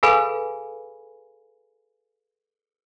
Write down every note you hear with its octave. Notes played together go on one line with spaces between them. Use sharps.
G#4 A4 B4 F5 G#5 B5